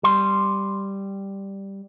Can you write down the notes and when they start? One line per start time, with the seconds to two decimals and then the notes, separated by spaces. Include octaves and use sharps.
0.03 G3 C6